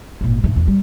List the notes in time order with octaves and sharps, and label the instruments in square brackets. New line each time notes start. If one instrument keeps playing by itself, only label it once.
[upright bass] G#1 A#2
G2 A3
E2
G3